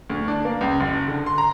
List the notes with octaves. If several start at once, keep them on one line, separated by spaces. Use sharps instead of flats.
D2
D4
A#3
C#2
F#1
D3
C6
A#5